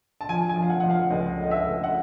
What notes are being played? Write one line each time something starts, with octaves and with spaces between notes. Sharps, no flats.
A5
F3 G#5
G#5
F3
F5
F#5
F3 F#5
F5
C#2 D#5
A3
D#5
E5
C#2
F#5